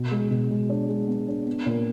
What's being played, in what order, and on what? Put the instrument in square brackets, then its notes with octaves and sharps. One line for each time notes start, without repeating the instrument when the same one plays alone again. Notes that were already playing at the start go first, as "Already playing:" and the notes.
Already playing: [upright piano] B2
G#3
B2
G#3
D4
G#3
B3
D4
B3
A#2